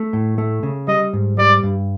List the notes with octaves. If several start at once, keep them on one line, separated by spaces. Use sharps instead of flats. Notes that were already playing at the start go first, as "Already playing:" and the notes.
Already playing: A3
A2
A3
C#3
G3 D#5
G#2
G3 D5
G2